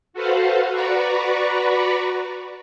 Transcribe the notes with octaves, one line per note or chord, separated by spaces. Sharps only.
F#4 A4 B4 C5 F5 F#5
F#4 B4 D5 A#5 B5 C#6